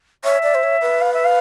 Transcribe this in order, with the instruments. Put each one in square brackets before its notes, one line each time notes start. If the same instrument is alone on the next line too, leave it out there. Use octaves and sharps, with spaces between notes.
[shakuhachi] C#5 [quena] E5
[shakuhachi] D5
C5
C#5
B4
[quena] F5
E5
F5